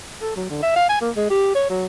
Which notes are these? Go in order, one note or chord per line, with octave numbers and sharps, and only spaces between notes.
A4
F#3
D3
E5
F5
G#5
A#3
G#3
G4
C#5
F#3